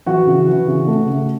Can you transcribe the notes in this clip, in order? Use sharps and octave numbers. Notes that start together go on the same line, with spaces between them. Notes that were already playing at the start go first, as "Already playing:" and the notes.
E3 F#4 F#5
C#3
E3
C#3
A3
C#3